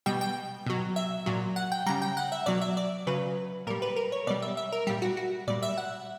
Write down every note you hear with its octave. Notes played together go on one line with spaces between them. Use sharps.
B2 G3 G5
G5
B2 F#3
E5
A#2 F#3
F#5
G5
C#3 G3 A#5
G5
F#5
E5
B2 F#3 D5
E5
D5
C#3 F#3 B4
A#2 G3 A#4
B4
A#4
C#5
B2 G3 D5
E5
E5
A#4
A#2 G3 G4
F#4
F#4
A#2 G3 D5
E5
F#5